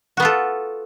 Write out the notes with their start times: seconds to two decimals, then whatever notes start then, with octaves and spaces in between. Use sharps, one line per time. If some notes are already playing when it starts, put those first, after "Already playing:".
0.17 F#4
0.20 B3
0.22 F4
0.25 A4